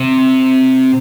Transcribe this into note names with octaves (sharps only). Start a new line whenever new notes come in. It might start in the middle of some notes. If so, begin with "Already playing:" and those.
Already playing: C3